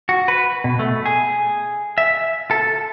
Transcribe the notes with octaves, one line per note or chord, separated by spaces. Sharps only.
F#4
B4
B2
A3
G#4
E5
A4